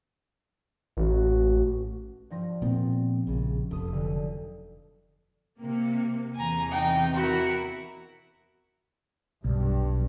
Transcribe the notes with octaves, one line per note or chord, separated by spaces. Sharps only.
A1 F#4
G2 F3 A#6
A#2 B3 C4
A#1 C#3
F1 A4 D#6
B1 D3
C3 A#3
E2 C3 E3 G#5 A#5
D#4 G5
E4 F#4 A#4
B1 G2